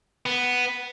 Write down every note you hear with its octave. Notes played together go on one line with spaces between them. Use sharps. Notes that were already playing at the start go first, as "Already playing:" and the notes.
B3